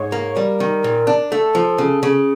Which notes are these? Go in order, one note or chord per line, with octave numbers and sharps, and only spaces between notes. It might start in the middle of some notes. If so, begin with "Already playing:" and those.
Already playing: G#2 C#5
A#3
G3 A#4
D#3
A#2
D4
A3 A4
F3
C#3
C#3